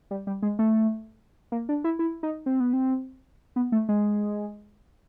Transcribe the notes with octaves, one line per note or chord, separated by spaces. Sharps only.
G3
G3
G#3
A3
A#3
D4
E4
E4
D#4
C4
B3
C4
B3
A3
G#3